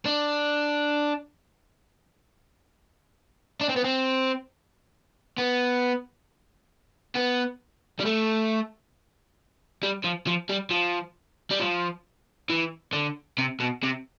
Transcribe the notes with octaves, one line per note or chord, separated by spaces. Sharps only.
D4
D4
C4
B3
C4
B3
B3
G3
A3
G3
F3
F3
G3
F3
G3
F3
E3
D3
C3
B2
C3